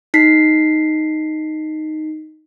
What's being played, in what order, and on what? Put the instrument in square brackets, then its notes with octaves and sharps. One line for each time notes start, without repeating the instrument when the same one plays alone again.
[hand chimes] D#4 B6 C7